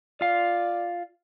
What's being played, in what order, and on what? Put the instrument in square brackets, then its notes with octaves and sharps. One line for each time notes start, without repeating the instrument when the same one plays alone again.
[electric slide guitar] F4 F5 [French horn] D5